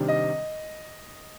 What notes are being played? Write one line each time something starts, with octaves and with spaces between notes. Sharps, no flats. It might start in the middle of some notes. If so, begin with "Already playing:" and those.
Already playing: C3 D#3 G3 D4
D#5